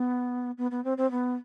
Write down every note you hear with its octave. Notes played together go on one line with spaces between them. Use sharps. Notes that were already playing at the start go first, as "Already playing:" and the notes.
Already playing: B3
B3
B3
C4
C4
B3